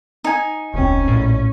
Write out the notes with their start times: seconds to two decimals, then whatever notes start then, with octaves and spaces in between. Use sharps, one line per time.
0.24 D#4 G#5
0.74 E1 C#2 C4 C#4
1.08 A#1 A2